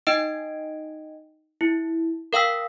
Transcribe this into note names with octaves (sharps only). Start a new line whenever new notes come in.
D#4 D#5 G5 D7
E4
A#4 F5 G5 E6 B6